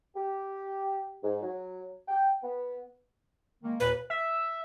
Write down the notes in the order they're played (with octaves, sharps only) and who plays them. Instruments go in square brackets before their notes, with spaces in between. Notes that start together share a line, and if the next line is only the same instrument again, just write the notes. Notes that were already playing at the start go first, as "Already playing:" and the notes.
[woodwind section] G4
G#2
F#3
G5
B3
D#3 G#3 A#3
[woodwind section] D#2 A#2 [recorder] B4
[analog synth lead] E5